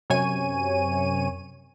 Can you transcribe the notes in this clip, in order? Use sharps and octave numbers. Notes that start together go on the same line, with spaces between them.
F#2 C3 C#5 G#5 D#7